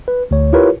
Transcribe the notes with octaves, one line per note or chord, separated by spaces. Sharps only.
B4
D2 C#5
E4 F4 G4 A#4 B4 C#5